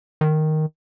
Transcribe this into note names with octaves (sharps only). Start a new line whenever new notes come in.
D#3